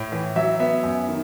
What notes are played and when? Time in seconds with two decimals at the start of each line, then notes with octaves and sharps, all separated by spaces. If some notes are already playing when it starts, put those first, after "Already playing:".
Already playing: A2
0.12 E3
0.36 F#3 E5
0.60 B3 E5
0.84 F#2
1.08 D#3